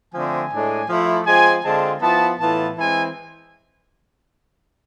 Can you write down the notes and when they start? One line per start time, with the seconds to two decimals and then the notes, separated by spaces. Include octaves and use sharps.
0.13 D3 F3 A3 C4 G#5
0.51 A2 G#3 D4
0.89 F3 A3 E4
1.26 F3 G#3 C4 G#5
1.64 D3 G#3 C4 F4 A5
2.01 F3 B3 E4 A5
2.39 A2 E3 B3 F4 A5
2.77 E3 G#3 C4 G#5